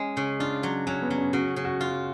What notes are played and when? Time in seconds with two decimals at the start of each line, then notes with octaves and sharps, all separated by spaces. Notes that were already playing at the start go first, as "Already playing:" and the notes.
Already playing: G#3 C#4
0.17 C#3
0.39 D4 F4
0.63 F#3
0.87 F#3 C#4
1.02 B3
1.10 F#3
1.18 C#4
1.33 C#3 F#4
1.56 C#3
1.65 F#4
1.81 F4